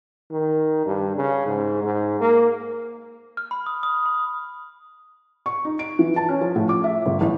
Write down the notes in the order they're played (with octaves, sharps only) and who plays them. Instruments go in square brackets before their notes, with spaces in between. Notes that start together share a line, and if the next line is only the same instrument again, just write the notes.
[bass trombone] D#3
G2
C#3
G#2
G#2
A#3
[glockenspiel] F6
B5
D#6
D#6
B5
[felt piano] C#6
D#4
D7
E3
A5
C#4
F3
A2
D6
E5
G1
A1